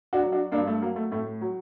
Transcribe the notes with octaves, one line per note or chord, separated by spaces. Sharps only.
D4 F#4
F#3
D4 F#4
G2 A#3 D4
A3
F#3 A#3
A3
A2 A3
F#3